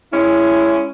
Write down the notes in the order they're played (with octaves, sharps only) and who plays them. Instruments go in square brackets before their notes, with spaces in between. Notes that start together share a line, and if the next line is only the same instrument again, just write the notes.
[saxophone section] G#3 C#4 E4